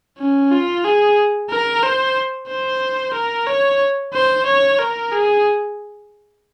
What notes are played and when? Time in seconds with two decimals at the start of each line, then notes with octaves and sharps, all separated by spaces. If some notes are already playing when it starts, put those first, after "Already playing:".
0.19 C#4
0.52 F4
0.84 G#4
1.50 A#4
1.83 C5
2.48 C5
3.14 A#4
3.47 C#5
4.13 C5
4.46 C#5
4.79 A#4
5.12 G#4